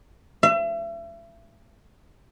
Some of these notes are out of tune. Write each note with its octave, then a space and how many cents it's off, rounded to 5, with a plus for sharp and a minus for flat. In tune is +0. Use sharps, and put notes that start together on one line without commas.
E5 +35